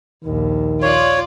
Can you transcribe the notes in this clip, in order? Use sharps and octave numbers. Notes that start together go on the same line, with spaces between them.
A#1 D#2 D#3
F4 C#5 D5